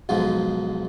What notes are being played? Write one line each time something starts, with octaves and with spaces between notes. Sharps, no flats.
B1 G#2 F3 G#3